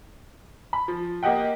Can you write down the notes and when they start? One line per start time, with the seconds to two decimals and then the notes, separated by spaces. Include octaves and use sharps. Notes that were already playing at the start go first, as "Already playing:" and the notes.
0.73 B5
0.88 F3
1.23 A#3 G4 D#5 F#5 G5